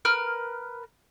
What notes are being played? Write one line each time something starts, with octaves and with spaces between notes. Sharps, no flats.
A#4 B4 F6